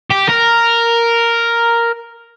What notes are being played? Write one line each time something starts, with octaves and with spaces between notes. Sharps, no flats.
G4
A#4